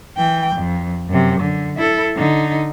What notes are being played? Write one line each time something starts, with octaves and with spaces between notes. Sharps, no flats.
E3 G5
F2
F#2 C3
D3
E4 A4
D3 D#4